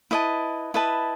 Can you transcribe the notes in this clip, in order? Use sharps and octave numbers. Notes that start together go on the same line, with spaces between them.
E4 B4 D#5 A5
E4 B4 D#5 A5